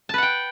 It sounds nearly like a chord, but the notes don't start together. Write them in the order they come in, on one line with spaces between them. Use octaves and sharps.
A5 B4 F#5 G5